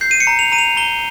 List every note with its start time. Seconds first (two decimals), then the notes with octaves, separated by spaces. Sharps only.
0.01 G6 C7
0.11 D#7
0.20 C#7
0.27 A#5
0.39 F7
0.52 A#5 D#7
0.58 F7
0.77 A#5 G7